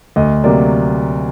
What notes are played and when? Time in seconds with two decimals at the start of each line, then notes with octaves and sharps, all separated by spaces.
0.16 D2 D#5
0.44 C3 F#3 A#3 D5